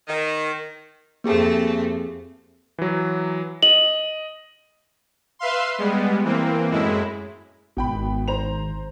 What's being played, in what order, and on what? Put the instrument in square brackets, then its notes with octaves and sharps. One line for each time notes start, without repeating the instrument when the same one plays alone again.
[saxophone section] D#3
[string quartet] F2 A3 C4 [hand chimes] A#3 G4 G#4
[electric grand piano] E3 F#3
[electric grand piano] D#5 [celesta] F#7
[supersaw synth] B4 E5 F5 C6
G3 G#3 B3
E3 A#3 C4
F#2 A2 G#3 E4
[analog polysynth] G#1 [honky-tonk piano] B2 G5 B5
[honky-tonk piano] C5 A#5 F7